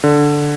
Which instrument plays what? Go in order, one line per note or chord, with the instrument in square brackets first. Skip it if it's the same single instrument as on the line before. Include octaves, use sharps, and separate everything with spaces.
[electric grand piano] D3